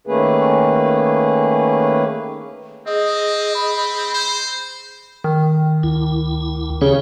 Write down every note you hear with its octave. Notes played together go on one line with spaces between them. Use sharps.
D#3 A3 A#3 C#4 G#4 B4
C4 G#4 D#5
B5
C5
D#3
D2 E4
C#3 G4 C#5